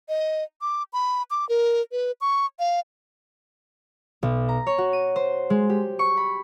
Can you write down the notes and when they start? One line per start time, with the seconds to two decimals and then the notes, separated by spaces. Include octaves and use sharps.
0.09 D#5
0.61 D6
0.93 B5
1.31 D6
1.49 A#4
1.92 B4
2.21 C#6
2.59 F5
4.23 B1
4.49 A#5
4.67 C#5
4.78 F#4
4.93 D#7
5.16 C5
5.50 G#3
5.70 G4
5.99 C#6
6.17 B5